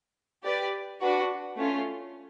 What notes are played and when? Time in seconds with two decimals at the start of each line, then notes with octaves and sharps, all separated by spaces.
0.43 G4 B4 D5
1.01 D4 F#4 B4
1.57 A3 C#4 F4